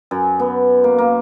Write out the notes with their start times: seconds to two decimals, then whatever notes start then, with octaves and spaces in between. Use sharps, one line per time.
0.11 F#2
0.39 B3
0.84 A#3
0.98 A#3